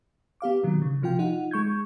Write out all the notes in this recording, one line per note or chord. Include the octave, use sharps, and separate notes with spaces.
B3 G4 F5 D6
A#2 D#3 F#3
C#3
C3 F3 F4 G5
D#4 F4 F#5
G#3 C#6 G6 G#6